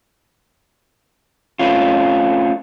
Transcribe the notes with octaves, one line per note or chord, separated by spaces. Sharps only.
A3 C4 C#4 F4